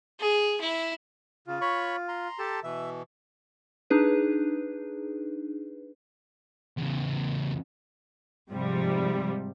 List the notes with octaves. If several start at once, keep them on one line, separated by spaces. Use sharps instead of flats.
G#4
E4
C#3 F4
C#5 B5 C#6
A#5 C6
G4 A4 A5
B2 E3 E5
D4 D#4 G#4 B4
E2 C#3
G#2 C3 F3 G3